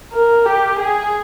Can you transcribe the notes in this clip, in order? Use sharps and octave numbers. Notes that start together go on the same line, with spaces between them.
A#4
G4
G#4